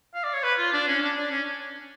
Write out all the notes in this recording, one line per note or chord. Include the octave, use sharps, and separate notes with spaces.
F5
D5
C#5
B4
F4
D4
C#4
D4
D4
C#4